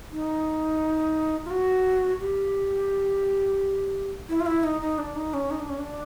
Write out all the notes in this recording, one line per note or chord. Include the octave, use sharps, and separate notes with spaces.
D#4
F4
F#4
G4
E4
F4
E4
D#4
D#4
D4
D#4
C#4
D#4
D4
C#4
D4